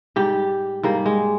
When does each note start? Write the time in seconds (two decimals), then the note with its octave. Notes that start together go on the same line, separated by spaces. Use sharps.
0.16 G#2 G3 G4
0.83 G#2 G3 A#3
1.06 G#3